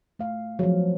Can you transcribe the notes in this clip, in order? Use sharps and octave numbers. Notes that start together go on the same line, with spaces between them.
A3 F5
F3 F#3